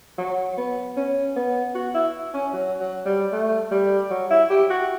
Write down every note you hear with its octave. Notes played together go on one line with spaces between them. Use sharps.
F#3
B3
C#4
B3
F#4
E4
C#4
F#3
F#3
G3
A3
G3
F#3
E4
G4
F#4